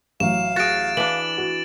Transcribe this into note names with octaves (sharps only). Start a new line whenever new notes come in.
A1 F#3 F5 E7
F#4 G#4 A6 D7
E3 D4 F#7
F#4